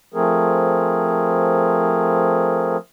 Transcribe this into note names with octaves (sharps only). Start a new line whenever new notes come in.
F3 A3 C4 G#4 A#4